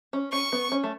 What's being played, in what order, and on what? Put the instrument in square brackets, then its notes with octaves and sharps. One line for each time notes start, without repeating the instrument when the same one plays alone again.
[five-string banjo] C#4
[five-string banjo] C#4 [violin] C#6
[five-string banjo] B3
C#4
A3